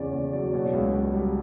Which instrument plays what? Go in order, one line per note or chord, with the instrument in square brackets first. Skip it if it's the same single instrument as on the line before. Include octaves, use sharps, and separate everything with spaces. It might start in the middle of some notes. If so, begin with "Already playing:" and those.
Already playing: [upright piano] E2 C#3 C#5 D5
E2 D5
F#3 D5
B2 C#5
C#2
C#2
G3